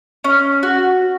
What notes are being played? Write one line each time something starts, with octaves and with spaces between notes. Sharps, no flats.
C#4
F#4